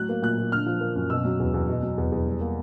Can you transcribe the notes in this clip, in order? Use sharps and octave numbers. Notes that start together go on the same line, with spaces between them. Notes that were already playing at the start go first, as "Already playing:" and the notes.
Already playing: A2 F#3 F#6
A#3
A#2 F#6
A#2
D3 F6
F3
A#3
F#2
B2 E6
F#3
E2
E2
B2
F#3
E2
E2
G3
A#3